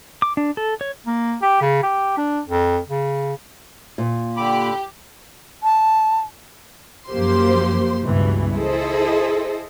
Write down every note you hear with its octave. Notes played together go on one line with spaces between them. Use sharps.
D6
D4
A4
C#5
A#3
G4
C#3
G4
D4
F2
C#3
A#2
D3 G4 B5 D6
A5
F#2 F3 A#3 G4 C5 C6
C#2 G2 B2 E3
E4 G#4 A4 C5 D#5